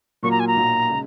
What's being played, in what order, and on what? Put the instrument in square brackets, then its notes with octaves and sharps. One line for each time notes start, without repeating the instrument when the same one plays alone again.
[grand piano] A#2 F#3 A#3 F4 [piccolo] C#6
[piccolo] A#5
G#5
A#5
[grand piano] B1 A#2 F#3
C#3 G#3